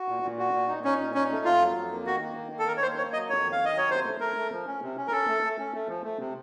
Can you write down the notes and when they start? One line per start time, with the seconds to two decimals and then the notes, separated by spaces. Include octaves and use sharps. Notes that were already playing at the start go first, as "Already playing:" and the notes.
Already playing: F#4
0.08 A#2
0.23 A#2
0.39 F#4
0.54 A#2
0.68 D#4
0.84 C#4 D#4
0.99 A#2
1.14 C#4 D#4
1.31 A3
1.45 F2 F4
1.61 F#3
1.76 F2
1.92 A#3
2.06 D#3 F#4
2.22 A#3
2.37 D#3
2.52 A#3
2.59 A4
2.68 D#3 A#4
2.77 C#5
2.82 A#3 C5
2.98 A#3 C#5
3.13 F#3 D#5
3.29 F2 C#5
3.44 D#3
3.52 F5
3.60 D#3
3.65 D#5
3.75 F#3 C#5
3.90 C3 C5
4.05 A3
4.20 A3 A#4
4.36 A3
4.52 F3
4.66 C#4
4.82 C3
4.97 C#4
5.07 A#4
5.12 C#4 A4
5.28 A3
5.43 A3
5.59 C#4
5.74 A3
5.88 F3
6.04 A3
6.20 C3